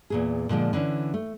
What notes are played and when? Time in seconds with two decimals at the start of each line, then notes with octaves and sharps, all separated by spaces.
0.10 E2 A#2 G#4
0.49 A#2 D3 F3 G#3
0.73 D3 E3 C#4
1.14 A3